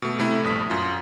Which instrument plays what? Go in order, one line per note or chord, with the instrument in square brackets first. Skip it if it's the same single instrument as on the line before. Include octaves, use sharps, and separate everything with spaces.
[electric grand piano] B2 A3
C3 A3 E4
A#1 G2 D#6 B6
F#2 F4